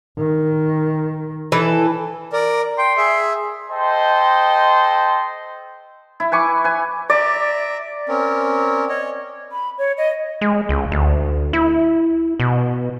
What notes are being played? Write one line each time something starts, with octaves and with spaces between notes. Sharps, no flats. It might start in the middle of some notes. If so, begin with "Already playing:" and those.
D#3
E3 A4
A#4 D5
G5 C6
G#4 E5
A4 C5 D#5 G5 C6
E4
B4 G#5 C#6 D6
B4 G#5
D5 E5 A#5
C4 C#4 A#4
C#5 D#5
B5
C#5
D#5
G#3
C#2
D2
E4
B2